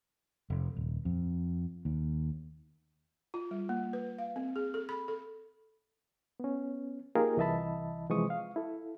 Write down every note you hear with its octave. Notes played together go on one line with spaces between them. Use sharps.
F1
D#1
F2
D#2
F4
G3
A#3
B4
F5
C4
G#4
A4
B5
A4
B3 C#4
A#3 D#4 F4 G4 G#4 A#4
C2 E3 D#5 E5 A5 B5
C3 E3 F3 G#3 C#6 D#6
F5
E4 A4